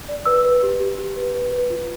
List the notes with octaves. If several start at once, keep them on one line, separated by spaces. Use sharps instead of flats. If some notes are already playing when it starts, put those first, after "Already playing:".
D5
B4 E6
B4
G4
G4
G4
B4
B4
B4
F4